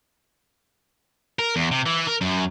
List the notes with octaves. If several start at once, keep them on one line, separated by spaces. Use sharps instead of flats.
A#4
E2
C3
E3
A#4
F#2